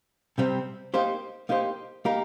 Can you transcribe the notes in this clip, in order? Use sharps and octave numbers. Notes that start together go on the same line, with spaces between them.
C3 G3 C4
A#3 D#4 G4 C5
A#3 D#4 G4 C5
A#3 D#4 G4 A#4